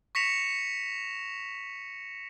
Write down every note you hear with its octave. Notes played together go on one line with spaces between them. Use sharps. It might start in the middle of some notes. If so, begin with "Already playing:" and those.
C#6 A#6 B6 C#7 E7 F7